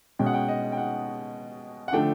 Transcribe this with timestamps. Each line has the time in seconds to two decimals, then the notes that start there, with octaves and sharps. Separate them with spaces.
0.19 B2 G#3 C#4 G5
0.26 F#5
0.34 G5
0.49 D#5
0.72 G5
0.77 F#5
1.88 F#5
1.92 D3 F3 A3 D4 G5